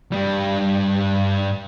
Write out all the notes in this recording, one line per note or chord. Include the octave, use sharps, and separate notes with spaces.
G2 G3